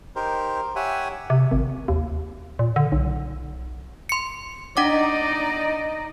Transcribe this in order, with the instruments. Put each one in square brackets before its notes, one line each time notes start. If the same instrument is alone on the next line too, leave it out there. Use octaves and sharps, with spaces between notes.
[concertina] D#4 G4 A#4 C5
G4 C#5 E5 F#5 G#5
[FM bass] C3
G#1
D#2
A#2
D3
B1
[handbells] C6 C#7
[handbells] D4 F#5 D6 [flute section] D#4 [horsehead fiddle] D5 D#5